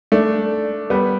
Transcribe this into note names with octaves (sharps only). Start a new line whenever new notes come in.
A3 D4
G3 B3